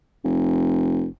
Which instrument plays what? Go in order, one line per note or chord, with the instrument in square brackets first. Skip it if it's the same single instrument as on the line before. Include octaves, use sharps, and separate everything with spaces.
[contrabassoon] F1